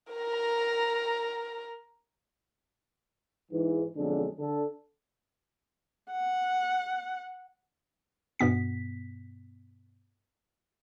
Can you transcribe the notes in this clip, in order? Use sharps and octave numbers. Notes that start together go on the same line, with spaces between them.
A#4 A#5
G#2 E3
B1 F2 D3 G#3 D4 A4
D3 A4
F#5
G2 B2 B3 B6